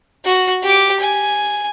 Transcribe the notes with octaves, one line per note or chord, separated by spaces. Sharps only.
F#4
G4 D6
G#5